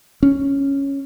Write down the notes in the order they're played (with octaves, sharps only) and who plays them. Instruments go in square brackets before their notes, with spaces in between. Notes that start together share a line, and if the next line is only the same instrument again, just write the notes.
[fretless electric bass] C#4